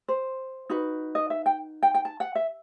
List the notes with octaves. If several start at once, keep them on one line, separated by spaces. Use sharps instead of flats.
C5
D#4 F#4 B4
D#5
E5
G5
G5
G5
A5
F#5
E5